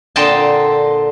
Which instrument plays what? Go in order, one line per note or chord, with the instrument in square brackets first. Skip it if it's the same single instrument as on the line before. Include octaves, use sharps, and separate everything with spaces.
[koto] A#2 D3 C4 D#5 G5 A5